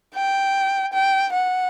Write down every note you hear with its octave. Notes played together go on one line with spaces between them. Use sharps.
G5
G5
F#5